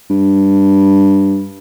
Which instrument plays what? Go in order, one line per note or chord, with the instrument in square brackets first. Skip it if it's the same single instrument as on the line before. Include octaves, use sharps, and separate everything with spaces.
[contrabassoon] G2